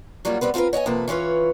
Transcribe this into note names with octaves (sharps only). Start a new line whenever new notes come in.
F#3 G3 A#3 C#4 F4 F#4
G3 B3 C4 B4
C4 F4 G4 A#4 B4
C#5 D#5 F#5 G#5
C3 F3 A#3 A4 B4
E3 C#4 F4 B4 C#5